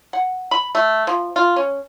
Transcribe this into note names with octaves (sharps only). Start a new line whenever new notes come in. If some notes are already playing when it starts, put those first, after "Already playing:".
F#5
B5
A3
F3
F4
C#4